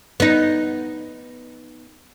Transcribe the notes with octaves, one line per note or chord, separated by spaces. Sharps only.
B3 D#4